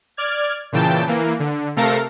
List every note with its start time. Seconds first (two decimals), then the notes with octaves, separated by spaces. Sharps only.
0.17 D5 F6 G#6
0.72 A#2 C#3 E3 G5 A5
1.07 E3 A#3
1.40 D3
1.76 C3 A3 A4 A#4 F5 A#6